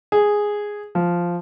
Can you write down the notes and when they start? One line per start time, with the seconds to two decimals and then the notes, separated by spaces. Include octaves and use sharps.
0.12 G#4
0.95 F3